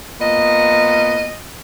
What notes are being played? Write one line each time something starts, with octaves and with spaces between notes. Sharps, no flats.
A#2 B3 D#5